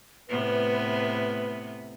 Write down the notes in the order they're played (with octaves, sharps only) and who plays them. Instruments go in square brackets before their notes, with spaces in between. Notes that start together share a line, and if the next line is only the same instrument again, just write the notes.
[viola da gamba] A2 C3 B3 [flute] B4